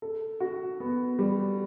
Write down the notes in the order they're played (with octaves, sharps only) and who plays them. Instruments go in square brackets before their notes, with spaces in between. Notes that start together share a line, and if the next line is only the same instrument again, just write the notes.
[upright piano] A4
F#4
B3
G3